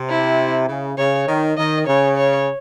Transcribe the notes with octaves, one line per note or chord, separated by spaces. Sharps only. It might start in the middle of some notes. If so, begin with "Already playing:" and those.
Already playing: C3
E4
C#3
C#3 C#5
D#3
D#3 D#5
C#3 C#5
C#5